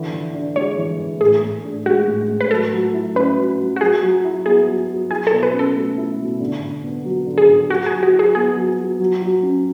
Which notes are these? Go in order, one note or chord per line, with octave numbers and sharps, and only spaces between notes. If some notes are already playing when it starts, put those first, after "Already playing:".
Already playing: D3 E3
E3
D4
G#3 C#5
E3
E3
A2 G#4
A2
D4
G#3 F#4
A2
A2
B4
F#3 A4
F#3
E4
C#4 B4
F#3
F#3
F#4
F#3 G#4
F#3
E4
B3 G#4
F#3
F#3
E4 G#4
A4
B2
B4
C#4
A4
A3
E4
B2
D3
D3
B3
F#3
D3
G#4
D3
F#3 F#4
G#4
F#3
F#4
E4
G#4
B3 G#4
F#3
F#3
F#3
F#3
C#4